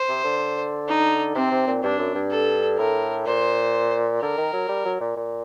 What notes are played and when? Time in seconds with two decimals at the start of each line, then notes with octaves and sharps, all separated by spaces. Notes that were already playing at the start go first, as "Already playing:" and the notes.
Already playing: C5
0.08 C3
0.24 D3
0.88 D#4
1.35 C3 C4
1.52 C3
1.67 A#2
1.83 G2 D4
1.99 F#2
2.15 G2
2.31 A4
2.78 A2 A#4
3.26 A#2 C5
4.21 D3 A#4
4.37 D#3
4.53 F#3
4.69 G3
4.85 F#3
5.01 A#2
5.16 A#2